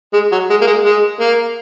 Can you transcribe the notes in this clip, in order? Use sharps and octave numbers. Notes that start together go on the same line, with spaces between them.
G#3
F#3
G#3
A#3
G#3
G#3
A#3